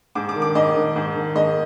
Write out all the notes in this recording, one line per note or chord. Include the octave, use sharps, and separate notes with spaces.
G#2 D6
D6
D#3
D6
G#2 D#5
D#3
G#2
D#3
G#2 D#5